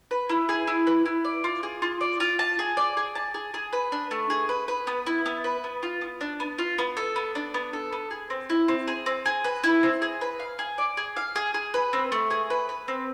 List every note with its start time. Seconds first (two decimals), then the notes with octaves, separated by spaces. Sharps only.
0.11 B4
0.29 E4
0.49 G#4
0.67 E4
0.87 B4
1.06 E4
1.25 D5
1.44 F4
1.63 G#4
1.82 F4
2.01 D5
2.20 F4
2.39 A5
2.59 G#4
2.77 D5
2.97 G#4
3.15 A5
3.34 G#4
3.54 G#4
3.73 B4
3.92 D4
4.11 A3
4.30 G#4
4.49 B4
4.68 B4
4.87 B3
5.06 E4
5.26 B3
5.44 B4
5.64 B3
5.83 F4
6.01 B3
6.21 D4
6.40 B3
6.58 F4
6.78 B3
6.97 A4
7.16 B3
7.35 D4
7.54 B3
7.73 A4
7.93 B3
8.11 G#4
8.30 C4
8.50 E4
8.68 C4
8.88 G#4
9.06 C4
9.26 G#4
9.44 B4
9.64 E4
9.83 C4
10.02 G#4
10.21 B4
10.40 F5
10.59 G#4
10.78 D5
10.97 G#4
11.17 F5
11.36 G#4
11.54 G#4
11.74 B4
11.93 C4
12.12 A3
12.30 G#4
12.50 B4
12.69 B4
12.88 C4